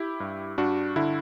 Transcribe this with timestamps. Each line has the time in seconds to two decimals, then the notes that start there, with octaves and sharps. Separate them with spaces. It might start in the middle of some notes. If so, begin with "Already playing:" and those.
Already playing: E4 G4
0.20 G2
0.58 G2 D4 F#4
0.96 D3 E4